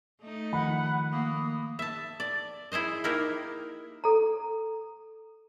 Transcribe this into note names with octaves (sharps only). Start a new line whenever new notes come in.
A3 D#4
D#3 F3 F#5 B5
A#3 D#6
E5 A5
D5
E4 G#4 C5 D#5
A#3 D#4 E4 G4 A#4
A4 A#5